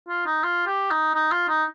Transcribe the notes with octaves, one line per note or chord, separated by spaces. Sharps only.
F4
D#4
F4
G4
D#4
D#4
F4
D#4